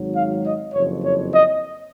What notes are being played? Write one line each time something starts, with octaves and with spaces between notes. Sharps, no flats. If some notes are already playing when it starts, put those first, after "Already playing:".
Already playing: G#1 G#2 F#3
F5
D#5
F#1 F2 F3 C#5
C#5
D#5